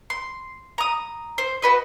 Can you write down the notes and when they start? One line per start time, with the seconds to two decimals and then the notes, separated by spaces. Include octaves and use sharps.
0.10 C6
0.78 A#5 D#6
1.38 C5
1.62 F#4 B4 D#5